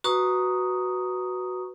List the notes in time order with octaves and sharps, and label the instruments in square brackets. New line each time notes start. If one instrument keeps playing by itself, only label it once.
[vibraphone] F#4 B4 A#5 C#6 D#6